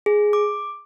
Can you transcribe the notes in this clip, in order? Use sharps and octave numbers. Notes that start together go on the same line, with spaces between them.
G#4
D6